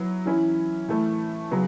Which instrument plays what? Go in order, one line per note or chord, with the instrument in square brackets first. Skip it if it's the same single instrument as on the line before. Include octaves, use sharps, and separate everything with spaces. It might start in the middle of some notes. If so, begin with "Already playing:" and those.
Already playing: [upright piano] F#3 B3 E4
E3 C#4 E4
A2 E3 A3 E4
C#3 F#3 B3